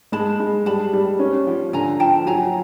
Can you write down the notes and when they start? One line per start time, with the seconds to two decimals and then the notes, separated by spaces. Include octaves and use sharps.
0.12 G#3 A5 B5
0.40 G#3
0.66 G3 A5 B5
0.93 G3
1.19 C#4
1.47 F3
1.73 D3 G#5 A#5
1.99 F3 G5 A5
2.26 F#3 G#5 A#5